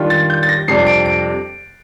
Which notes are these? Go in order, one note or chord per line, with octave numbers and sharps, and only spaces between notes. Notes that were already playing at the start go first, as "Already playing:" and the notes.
Already playing: D#3 G3 D4 F4
A6
G6
A6
A#6
F2 C3 G3 D4 C7
D7
D7